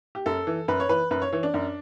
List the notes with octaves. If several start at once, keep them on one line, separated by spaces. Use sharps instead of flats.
G4
F#2 A4
E3
F#2 B4
C#5
E3 B4
F#2 B4
C#5
E3 C#5
D4
F#2